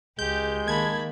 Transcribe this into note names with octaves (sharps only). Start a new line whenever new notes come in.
C#2 G#3 G4 G6
D#3 A#3 A5 B5 G#6